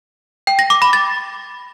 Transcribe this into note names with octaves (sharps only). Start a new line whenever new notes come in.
G5
A#6
D6
B5
A6